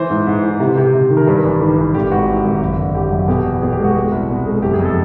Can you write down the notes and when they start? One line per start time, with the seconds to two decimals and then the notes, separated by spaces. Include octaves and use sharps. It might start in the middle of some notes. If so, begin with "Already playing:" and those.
Already playing: E3 C5
0.10 G#2
0.27 G#2
0.43 E3
0.60 C3
0.78 C3
0.94 C3
1.10 D#3
1.17 A#4
1.27 G2 B4
1.44 A1
1.60 D#3
1.78 A1
1.94 G#1 G4
2.11 G#2 F#4
2.29 G#2
2.45 G#1
2.61 F#1
2.78 D3
2.94 F#3 G4
3.11 F#2
3.28 B2 G4
3.45 E2
3.62 B2 G#4
3.72 G4
3.79 G#3
3.84 F#4
3.96 G#3
4.12 C2
4.29 B2
4.46 G#3
4.62 F#1 G4
4.73 G#4
4.79 F2
4.85 A4